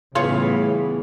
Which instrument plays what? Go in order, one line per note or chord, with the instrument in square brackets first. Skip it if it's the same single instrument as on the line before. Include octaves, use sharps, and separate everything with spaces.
[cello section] A2 E3 [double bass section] C#3 G3 B3 [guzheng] F4 C#5 [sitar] G#4